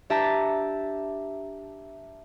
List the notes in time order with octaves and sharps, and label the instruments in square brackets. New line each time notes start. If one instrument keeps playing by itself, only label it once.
[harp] D4 G4 E5 A5 A#5